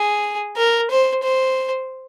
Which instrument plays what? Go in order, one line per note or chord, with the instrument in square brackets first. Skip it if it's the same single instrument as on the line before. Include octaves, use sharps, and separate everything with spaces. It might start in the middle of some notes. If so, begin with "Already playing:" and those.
Already playing: [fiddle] G#4
A#4
C5
C5